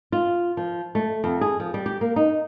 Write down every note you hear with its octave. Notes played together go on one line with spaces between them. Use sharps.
F4
F3
A3
F2
G#4
F3
G3
G4
A#3
D#4